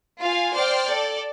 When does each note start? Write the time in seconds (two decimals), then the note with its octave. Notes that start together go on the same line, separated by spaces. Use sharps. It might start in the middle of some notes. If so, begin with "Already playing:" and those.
0.20 F4 F5 G#5
0.55 C5 D5 G5 F6
0.87 A4 D5